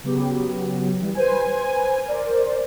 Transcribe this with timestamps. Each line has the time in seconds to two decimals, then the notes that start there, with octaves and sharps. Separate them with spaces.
0.04 C#3 F#3 B3 G4
1.01 E3 G3
1.15 B4 C5 G#5
2.05 A#4 C5 D5